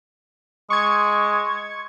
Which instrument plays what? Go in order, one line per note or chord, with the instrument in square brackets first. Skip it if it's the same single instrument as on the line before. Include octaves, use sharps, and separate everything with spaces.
[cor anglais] G#3 [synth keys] C#6 G#6